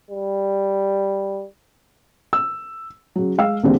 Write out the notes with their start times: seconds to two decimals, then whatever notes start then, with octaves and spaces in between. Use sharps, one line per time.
0.11 G3
2.33 E6
3.16 C#3 F#3
3.38 G#3 F5 E6
3.63 E2 A#2 D3 G3 C4